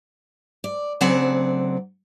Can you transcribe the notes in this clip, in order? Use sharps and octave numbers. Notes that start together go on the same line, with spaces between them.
D5
D2 C#3 F#3 C4 D5 F#5